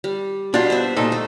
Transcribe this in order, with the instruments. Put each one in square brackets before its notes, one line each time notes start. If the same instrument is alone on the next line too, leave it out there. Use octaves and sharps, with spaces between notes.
[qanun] G3
[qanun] B2 [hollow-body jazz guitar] D4 F4
[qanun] C5 E5
[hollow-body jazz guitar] A#2 D#4 A4
[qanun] A3